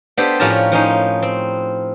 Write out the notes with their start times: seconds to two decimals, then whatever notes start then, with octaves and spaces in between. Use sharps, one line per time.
0.17 B3 D4 G4 A4 C5
0.40 A2 F3 C#4 G4 A#4 A5
0.72 F3 C#4 D#4 C5
1.22 C4